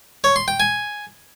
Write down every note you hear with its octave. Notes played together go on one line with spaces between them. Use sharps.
C#5
C6
G5
G#5